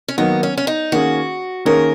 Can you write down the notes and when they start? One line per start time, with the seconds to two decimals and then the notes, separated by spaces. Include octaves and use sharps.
0.08 C#4
0.18 D#3 F#3 A#3 B3 D#4
0.43 C#4
0.57 C#4
0.67 D#4
0.92 D#3 A#3 C#4 F#4 G#4
1.65 D#3 A#3 C#4 G#4 A#4 C#5